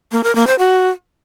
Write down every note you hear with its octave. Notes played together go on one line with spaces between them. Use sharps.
A#3
A#4
A#3
C5
F#4